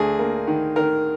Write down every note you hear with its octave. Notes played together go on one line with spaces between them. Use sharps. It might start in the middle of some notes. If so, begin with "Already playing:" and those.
Already playing: D2 G#4
A#3
D#3
D#3 A#4